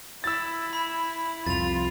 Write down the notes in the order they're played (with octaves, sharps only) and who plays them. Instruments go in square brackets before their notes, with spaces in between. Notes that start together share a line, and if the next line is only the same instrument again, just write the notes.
[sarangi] E4 [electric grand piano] E6 A6
[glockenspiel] B5
[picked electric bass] C2 F2 [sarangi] F4 [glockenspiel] A6 F7